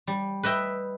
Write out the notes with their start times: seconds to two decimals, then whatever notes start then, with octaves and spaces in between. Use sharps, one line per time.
0.07 G3
0.43 B4 D#5 E5 G5